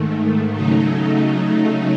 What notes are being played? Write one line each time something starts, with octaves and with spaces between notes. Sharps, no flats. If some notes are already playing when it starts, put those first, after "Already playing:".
Already playing: G#2 D#3 A3
C#3 F#3 A3 D#4